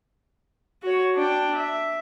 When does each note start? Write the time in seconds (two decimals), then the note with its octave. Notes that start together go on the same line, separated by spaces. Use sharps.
0.83 F#4 C#5
1.16 D4 G5
1.56 E5